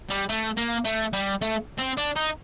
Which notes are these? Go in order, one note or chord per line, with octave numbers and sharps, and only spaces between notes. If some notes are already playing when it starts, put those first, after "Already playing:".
G3
A3
A#3
A3
G3
A3
C4
D4
D#4